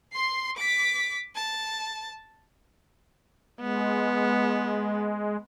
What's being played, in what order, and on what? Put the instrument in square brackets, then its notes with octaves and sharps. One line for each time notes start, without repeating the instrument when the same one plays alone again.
[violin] C6 C7
D6 B6
A5
[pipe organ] G#3 [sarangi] B3